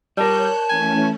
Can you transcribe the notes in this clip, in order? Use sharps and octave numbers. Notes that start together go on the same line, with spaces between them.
G3 A#4 C#5 D5 A5 F#6 G6
E3 A3 C#4 G#5